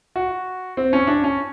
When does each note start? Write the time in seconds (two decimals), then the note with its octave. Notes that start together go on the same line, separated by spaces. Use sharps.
0.16 F#4
0.77 C4
0.93 C#4
1.07 D4
1.24 C#4